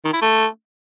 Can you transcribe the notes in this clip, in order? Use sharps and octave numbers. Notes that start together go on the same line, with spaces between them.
D#3
E4
A3